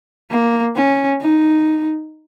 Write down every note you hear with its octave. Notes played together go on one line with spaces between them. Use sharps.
A#3
C#4
D#4